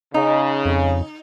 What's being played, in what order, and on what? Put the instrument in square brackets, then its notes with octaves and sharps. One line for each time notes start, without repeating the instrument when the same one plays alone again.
[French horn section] C#3 [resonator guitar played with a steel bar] D#4
[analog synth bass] F2